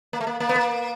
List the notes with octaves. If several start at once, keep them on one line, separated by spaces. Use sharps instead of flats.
A#3
A3
A#3
A#3
B3
A#3